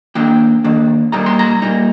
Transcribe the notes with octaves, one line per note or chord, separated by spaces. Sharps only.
D#3 A#3 D4 G5
D#3 A#3 D4
A#2 G3 A#3 D#4 A#5
C6
A#5
A#2 G3 A#3 D#4